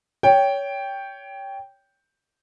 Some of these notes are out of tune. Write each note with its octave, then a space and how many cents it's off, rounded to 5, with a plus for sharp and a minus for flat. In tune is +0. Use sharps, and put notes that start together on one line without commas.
C#5 +20 G5 +0